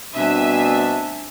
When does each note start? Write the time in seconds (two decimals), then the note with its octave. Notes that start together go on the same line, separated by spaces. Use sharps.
0.16 B2 G3 A3 C4 D4 E5 G#5